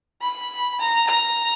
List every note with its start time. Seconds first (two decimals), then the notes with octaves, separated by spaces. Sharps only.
0.21 B5
0.80 A#5
1.07 A#5